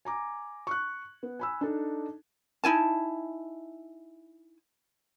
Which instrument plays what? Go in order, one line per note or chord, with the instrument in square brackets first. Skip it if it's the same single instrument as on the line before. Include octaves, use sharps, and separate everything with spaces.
[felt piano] G#5 A#5 D6
C#6 F#6
B3
G#5 B5 E6
D4 D#4 A4
[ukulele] D#4 E4 G#5 A5